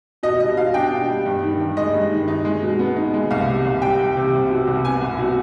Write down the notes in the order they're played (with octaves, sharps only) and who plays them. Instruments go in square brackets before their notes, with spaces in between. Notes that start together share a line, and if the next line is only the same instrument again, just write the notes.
[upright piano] B2 D#5
G3 D#5
B2 F5
D4 G5
B2
G3
G2
D#3
G2
G#3 D#5
G2
D#3
D#4
G#3
B2
B3
D#4
G#3
C2 F5
C3
C2
G3 G5
C2
C3
C2
B2
C2
B3 G#5
C2
B2